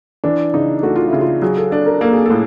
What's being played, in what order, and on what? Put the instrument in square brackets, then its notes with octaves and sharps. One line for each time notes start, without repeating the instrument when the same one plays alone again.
[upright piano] E3 [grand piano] D4
[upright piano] C#3 [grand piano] D#4
[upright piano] A3 [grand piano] F#4
[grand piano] F4
[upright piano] C#3 [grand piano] E4
[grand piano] F4
[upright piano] F#3 [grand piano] G#4
[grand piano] A4
[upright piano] D4 [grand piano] A4
[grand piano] A#4
[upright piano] A#3 [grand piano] A4
[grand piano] G#4
[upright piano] A2 [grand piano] A4